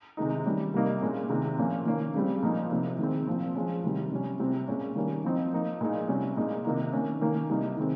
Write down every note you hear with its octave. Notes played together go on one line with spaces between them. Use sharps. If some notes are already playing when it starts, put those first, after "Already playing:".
C3 D#3 G#3 D#4
D#3 G3 C#4
C3 G3 A#3 D#4
A#2 G#3 C#4
C3 D#3 G#3
A#2 F3 A#3 C#4
D#3 A#3 C#4
C#3 G3 C4
A#2 F3 A#3 D#4
C3 F3 A#3 D#4
D#3 G#3 C4
A#2 F3 C4
F3 G#3 C#4
C3 D#3 G3
C3 G3 C#4
C3 G3 C4
A#2 G#3 C#4
D#3 G3 A#3 C#4
F3 C4 D#4
F3 A#3 D#4
A#2 G#3 D#4
C3 G3 C#4
A#2 G#3 D#4
C3 D#3 A#3 D#4
D#3 A#3 C#4
D#3 A#3 C#4
C3 G3 A#3 D#4
C3 D#3 G#3 C4